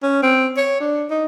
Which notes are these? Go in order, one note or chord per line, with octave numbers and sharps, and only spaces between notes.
C#4
C4
C#5
D4
D#4